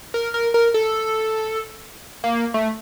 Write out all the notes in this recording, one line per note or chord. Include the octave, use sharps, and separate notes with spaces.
A#4
A#4
A#4
A4
A#3
A3